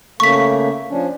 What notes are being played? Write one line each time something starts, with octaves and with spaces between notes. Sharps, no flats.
C#3 A3 A#3 C#6 B6
F3 C#4 D4